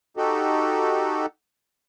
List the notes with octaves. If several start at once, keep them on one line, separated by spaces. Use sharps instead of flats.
D#4 F#4 G4 A4